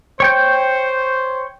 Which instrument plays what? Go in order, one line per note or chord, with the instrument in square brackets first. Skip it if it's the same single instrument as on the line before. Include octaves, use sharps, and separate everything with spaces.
[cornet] C5 [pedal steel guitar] C#5 G5 G6